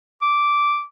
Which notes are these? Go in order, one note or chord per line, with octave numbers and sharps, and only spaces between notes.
D6